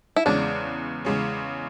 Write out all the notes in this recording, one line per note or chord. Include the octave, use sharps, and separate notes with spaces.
E4
E2 C#3 G#3 C#4 D4
E2 C#3 G#3 C#4